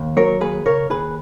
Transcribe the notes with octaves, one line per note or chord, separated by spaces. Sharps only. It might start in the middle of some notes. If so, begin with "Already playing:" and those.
Already playing: D#2
F#3 A#4 C#5
D#2 G#4 B4
C#3 A#4 C#5
D#2 G#4 B4